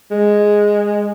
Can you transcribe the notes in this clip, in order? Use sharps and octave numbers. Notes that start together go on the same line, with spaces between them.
G#3